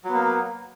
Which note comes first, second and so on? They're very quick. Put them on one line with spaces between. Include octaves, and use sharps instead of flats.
F#3 B3 A#3